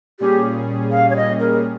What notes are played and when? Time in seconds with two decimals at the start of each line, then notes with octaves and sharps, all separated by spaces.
0.20 A#2 G3 C#4 G4 G#4
0.92 F5
1.10 C#5
1.16 D#5
1.40 A#4